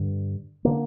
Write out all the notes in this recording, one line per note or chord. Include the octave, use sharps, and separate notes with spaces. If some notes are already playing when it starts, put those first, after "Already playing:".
Already playing: G2 D3
D3 A#3